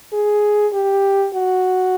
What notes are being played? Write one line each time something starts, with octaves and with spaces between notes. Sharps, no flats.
G#4
G4
F#4